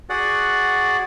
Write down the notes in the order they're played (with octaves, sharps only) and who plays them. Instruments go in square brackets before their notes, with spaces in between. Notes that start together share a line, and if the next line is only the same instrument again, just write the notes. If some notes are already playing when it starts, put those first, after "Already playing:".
[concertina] F#4 G#4 D5 F#5